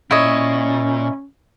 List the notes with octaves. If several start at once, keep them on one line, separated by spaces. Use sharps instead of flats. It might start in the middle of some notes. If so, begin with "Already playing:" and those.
A#2 C#4 E4 C#5 D#5